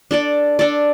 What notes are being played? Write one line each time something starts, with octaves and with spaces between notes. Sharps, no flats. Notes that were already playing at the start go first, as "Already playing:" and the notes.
D4 A4 D5
D4 A4 D5